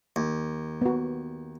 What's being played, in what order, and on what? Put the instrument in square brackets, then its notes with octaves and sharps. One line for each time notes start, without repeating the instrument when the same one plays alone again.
[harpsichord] D#2
[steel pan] B3 F#4